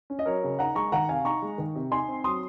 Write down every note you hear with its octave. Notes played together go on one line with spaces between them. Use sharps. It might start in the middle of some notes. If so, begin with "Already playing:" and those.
C#4
D#5
F#3 A#4 C#5
C#3
D#4 F#5 A#5
G#3 A#5 C#6
D#3 F#5 A#5
C3 F5 G#5
D#4 A#5 C#6
G#3
D#3
C3
D#4 G#5 C6
C4
F#3 C6 D#6